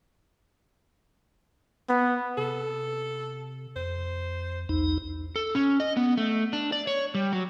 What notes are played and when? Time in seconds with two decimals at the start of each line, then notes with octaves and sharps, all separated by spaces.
1.89 B3
2.38 C3 A4
3.76 F2 C5
4.69 B1 E2 D#4
5.36 A4
5.55 C#4
5.80 D#5
5.97 B3
6.17 A3
6.53 D4
6.72 D5
6.87 C#5
7.15 G3
7.33 F#3